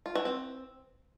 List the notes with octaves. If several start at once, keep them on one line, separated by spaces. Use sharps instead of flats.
F4
E3
C4